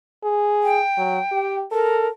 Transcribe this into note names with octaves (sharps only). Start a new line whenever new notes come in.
G#4
G5
F#3
G4
A4 A#4